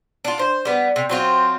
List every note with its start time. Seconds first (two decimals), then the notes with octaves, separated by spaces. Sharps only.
0.25 D4 F4
0.39 C5
0.65 G3 B3
0.96 C3
1.09 F#3 C4 F4